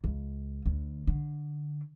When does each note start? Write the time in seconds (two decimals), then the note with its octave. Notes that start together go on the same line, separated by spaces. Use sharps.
0.04 C#2
0.66 D2
1.07 D3